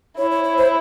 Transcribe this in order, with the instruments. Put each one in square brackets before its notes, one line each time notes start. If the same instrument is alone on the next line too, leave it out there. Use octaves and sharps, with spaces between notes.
[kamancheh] E4 [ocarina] C#5
[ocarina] C#5
C#5
C5